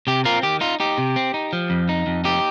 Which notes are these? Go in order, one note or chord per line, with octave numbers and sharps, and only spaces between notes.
C3 G4
C4 F4 A#4
D#3 G4
D#4 F4
D#4 G4
C3
C4
D#4
F3
F2
D#4
F2
D#4 G4